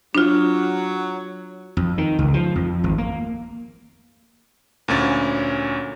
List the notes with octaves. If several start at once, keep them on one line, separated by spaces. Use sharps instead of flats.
F#3 D4 F4
F2
D#3
C#2
F3
F2
G#1
A#3
D2 A#2 C#4 A6